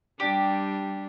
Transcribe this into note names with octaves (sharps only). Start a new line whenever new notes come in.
G3 D4 G4